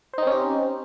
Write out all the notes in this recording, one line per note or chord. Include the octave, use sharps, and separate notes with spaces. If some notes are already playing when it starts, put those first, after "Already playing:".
C4 C#4 D#4 G4 C5